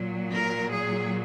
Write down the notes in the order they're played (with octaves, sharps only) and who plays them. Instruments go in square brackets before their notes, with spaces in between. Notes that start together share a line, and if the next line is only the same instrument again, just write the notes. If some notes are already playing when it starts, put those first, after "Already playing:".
Already playing: [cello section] A#2 F#3
A#4
G#4